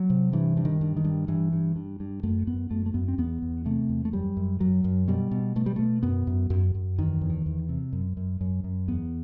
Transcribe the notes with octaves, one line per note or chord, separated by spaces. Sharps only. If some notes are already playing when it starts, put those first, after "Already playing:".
Already playing: F#3
C3
G2 E3
G2
D#3
G2
D#3
G2
G2 E3
G2
G2
G2
F#2 A3
F#2 B3
F#2 A3
A3
F#2 B3
C4
E2 B3
E2
C3 A3
E2
A3
F#2 G3
F#2
F#2 F#3
F#2
B2 G3
B2
B2 A3
G3
B2 A3
F#2 B3
F#2
F#2
F#2
E2 D#3
E2
D#3
E2
C3
F#2
F#2
F#2
F#2
E2 B3